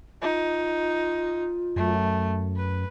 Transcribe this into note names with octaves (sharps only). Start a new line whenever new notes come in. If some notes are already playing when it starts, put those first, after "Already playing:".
D#4 F4
F#2 A3
B4